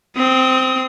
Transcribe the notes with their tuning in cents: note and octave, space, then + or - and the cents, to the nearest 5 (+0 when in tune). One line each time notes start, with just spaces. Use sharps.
C4 -10 D#6 +25